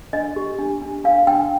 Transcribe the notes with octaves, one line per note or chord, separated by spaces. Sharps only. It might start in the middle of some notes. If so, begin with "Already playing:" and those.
D4 D#5
G4
D4
D4
D4 F5
D4 G5